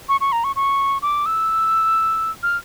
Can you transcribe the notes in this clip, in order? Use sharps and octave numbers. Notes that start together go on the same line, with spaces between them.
C#6
C#6
A#5
C#6
C#6
D6
E6
F6